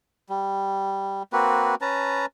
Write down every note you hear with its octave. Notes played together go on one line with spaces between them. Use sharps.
G3
A#3 C4 F#4 B4
C#4 B4 A5 A#5